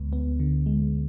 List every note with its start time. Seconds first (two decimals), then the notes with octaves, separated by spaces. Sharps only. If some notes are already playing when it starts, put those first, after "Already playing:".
Already playing: D2 D3 G#3 B3
0.13 B3
0.40 D3
0.66 G#3